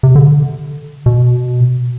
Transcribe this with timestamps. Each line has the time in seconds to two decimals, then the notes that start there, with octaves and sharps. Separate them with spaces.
0.03 C3
0.15 D3
1.06 B2